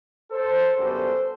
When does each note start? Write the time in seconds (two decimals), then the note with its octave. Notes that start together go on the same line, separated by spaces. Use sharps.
0.31 A4 C5
0.77 F#2 D3 G3 B3 A4 C5